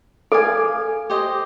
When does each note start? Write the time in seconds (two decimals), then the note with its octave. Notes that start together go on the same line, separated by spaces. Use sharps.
0.32 A4 D5 F5 G#5
1.10 G4 C5 D#5